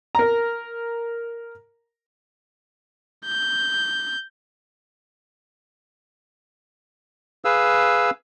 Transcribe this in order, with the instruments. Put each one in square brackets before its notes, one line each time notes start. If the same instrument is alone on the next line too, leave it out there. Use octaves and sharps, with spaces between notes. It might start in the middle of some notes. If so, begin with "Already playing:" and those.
[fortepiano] A#4 A#5
[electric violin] G6
[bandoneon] G#4 B4 F5 E6